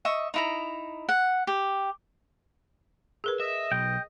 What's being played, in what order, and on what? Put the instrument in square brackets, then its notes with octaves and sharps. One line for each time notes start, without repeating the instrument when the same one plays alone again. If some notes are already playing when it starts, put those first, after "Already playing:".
[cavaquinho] D#5 E5 C#6
D#4 E4 A#5
F#5
G4
[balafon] G#4 A#4 B4
[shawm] D#5 [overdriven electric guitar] E5
[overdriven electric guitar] B1 [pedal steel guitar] G5